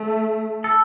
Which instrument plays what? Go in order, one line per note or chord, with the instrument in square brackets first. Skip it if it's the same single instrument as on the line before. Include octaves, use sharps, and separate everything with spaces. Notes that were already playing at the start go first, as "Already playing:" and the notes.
Already playing: [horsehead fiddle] A3
[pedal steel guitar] A4